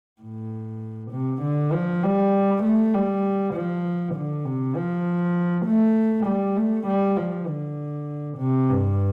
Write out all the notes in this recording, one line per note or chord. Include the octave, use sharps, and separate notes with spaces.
A2
C3
D3
F3
G3
A3
G3
F3
D3
C3
F3
A3
G3
A3
G3
F3
D3
C3
G2